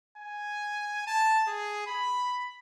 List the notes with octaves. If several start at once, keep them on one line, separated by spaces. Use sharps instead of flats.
G#5
A5
G#4
B5